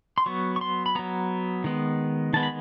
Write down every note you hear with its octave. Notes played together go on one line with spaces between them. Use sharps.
C6
F#3 B3 C#6
C#6
C6
B5
F#3 B3 A#5
D#3 G#3 B3
D#3 G#3 B3 A5
B5